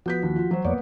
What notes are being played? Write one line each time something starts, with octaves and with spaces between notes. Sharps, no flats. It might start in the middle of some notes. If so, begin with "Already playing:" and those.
F3 B3 F#4 G6 B6
D#2
F4
F#3 C5
F2 A#3 B3 C#5 D5 F#5